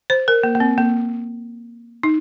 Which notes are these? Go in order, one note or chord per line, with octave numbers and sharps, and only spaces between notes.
C5
A#4
A#3
A#3
C4
A#3
D#4